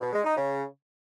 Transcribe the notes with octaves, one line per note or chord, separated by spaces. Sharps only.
B2
G#3
D#4
C#3